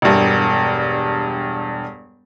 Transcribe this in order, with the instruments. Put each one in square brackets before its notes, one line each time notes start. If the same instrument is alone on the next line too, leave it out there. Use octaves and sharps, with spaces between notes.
[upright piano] E1 G2